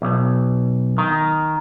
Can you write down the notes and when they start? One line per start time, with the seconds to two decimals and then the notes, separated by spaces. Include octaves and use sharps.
0.02 B1
0.98 D#3